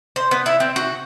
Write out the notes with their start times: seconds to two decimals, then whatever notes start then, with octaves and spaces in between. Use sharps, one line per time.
0.16 C5
0.31 B3
0.46 E4
0.60 C4
0.76 F#4